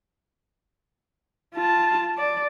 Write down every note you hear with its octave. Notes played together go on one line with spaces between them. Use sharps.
F4 A5
D5